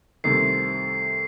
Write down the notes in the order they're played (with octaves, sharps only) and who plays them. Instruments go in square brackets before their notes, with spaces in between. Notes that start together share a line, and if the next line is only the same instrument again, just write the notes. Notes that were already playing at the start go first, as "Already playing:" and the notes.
[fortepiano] C2 C3 D#3 A3 [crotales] C7